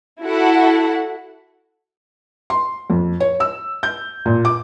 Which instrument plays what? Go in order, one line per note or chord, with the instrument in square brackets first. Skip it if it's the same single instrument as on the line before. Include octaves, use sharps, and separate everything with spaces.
[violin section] E4 F#4 A4 F#5
[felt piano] C6
F2
C#5
E6
G6
A#2
D6